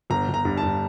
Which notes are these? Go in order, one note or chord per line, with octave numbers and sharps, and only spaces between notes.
G1 A#5
G1
A#5
G2
A5
G2